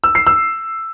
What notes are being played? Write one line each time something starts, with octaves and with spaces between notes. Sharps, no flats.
E6
C7
E6